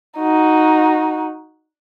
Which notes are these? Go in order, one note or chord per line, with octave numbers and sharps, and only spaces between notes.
D#4 F#4